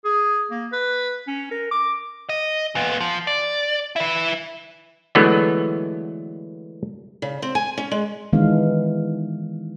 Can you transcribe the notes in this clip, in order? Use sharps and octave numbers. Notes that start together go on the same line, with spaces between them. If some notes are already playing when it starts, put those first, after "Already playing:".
G#4
A#3
B4
C#4
A#4
D6
D#5
A#2 B3
F3
D5
E4 B4
D3 E3 F#3 G#3 A3 B3
C#3
C4
G#5
C#4
G#3
D#3 E3 G#3 B3 D4 F5